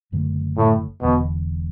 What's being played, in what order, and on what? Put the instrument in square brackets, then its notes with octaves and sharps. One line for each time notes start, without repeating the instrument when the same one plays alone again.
[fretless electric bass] F#1 F#2 D3 A3
[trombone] A2
[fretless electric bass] E1 E2 D3 [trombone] B2